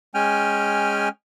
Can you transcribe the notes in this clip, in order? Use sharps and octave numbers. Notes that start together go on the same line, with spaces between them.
G#3 C#4 G5 G#5 F6